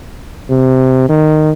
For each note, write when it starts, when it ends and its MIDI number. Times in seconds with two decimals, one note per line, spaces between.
0.49 1.07 48
1.09 1.51 51